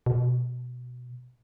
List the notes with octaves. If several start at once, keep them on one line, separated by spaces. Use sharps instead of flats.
B2